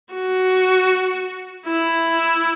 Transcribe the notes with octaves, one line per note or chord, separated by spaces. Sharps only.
F#4
E4